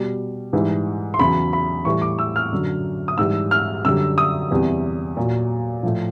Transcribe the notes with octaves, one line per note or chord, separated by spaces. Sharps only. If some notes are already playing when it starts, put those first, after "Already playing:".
Already playing: B2 G3
G#2 E3 G3
C6
E2 C#3 F#3 B5
B5
A2 E3 G3 C#6
D6
E6
F6
F#2 D3 F#3
D#6
G#2 E3 G3 E6
F6
F#2 D3 G3 E6
D#6
E2 C3 E3 G3
A#2 F#3
A2 F3